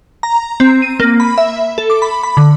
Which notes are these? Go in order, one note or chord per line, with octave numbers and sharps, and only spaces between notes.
A#5
C4
D#7
A#3
B5
E5
A4
D6
B5
B5
D3